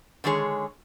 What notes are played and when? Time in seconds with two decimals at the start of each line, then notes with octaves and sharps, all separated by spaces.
0.24 D3 D#3 G#3 G#4 C#5